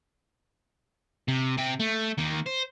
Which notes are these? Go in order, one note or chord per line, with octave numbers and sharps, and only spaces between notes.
C3
C3 G5
A3
D#3 A#3
C5